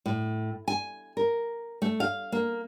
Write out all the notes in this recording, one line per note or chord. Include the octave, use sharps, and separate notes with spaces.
A2
G#5
A#4
A3
F5
A#3